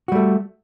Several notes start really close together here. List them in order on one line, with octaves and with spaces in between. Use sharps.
F#4 G3 A3